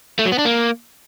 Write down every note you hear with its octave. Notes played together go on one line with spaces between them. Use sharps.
A3
F#3
B3
D4
A#3